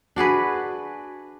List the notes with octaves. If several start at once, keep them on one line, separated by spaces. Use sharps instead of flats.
D4 F#4 G#4 B4